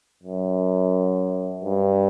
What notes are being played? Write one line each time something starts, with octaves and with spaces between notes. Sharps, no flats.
F#2
G2